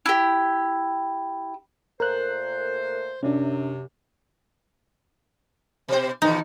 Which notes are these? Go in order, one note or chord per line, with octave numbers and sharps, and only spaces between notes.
E4 G4
A#2 A3 A#4 C5 F#6
F#2 C3 C#4 D4
B2 C5
E2 B2 D#3 D#4